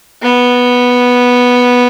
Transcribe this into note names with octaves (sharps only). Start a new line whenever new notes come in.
B3